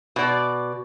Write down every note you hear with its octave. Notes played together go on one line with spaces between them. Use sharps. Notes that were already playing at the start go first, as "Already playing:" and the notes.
B2 D5